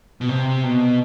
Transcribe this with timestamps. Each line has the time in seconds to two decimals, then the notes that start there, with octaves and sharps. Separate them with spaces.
0.21 B2
0.29 C3
0.63 B2